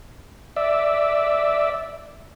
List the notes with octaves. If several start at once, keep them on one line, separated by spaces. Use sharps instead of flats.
D5 E5